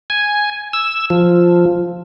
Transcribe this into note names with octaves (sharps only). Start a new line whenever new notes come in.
G#5
E6
F3